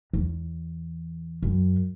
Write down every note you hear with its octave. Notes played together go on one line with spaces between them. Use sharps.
E2
F#2